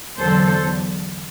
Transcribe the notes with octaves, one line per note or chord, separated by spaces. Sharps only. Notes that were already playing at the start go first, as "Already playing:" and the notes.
E2 D3 F#3 A4 C5